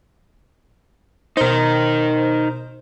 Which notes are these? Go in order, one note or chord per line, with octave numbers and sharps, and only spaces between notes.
B2 D#4 A#4 C5